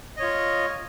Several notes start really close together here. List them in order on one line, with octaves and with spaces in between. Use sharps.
D#5 C#5 F4